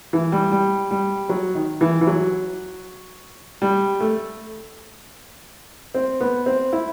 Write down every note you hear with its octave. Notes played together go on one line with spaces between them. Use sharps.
E3
G3
G3
G3
F#3
D#3
E3
E3
F#3
G3
A3
C4
B3
C4
E4